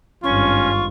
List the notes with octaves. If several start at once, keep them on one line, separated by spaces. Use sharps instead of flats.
G#1 G2 C#4 F4 C#6